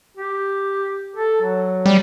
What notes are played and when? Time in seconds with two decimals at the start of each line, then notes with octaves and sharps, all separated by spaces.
0.17 G4
1.16 A4
1.42 F#3
1.86 G3